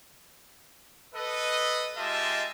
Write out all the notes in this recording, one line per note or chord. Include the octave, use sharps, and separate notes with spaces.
A4 B4 D#5
G#3 F4 G4 D#5 E5 A5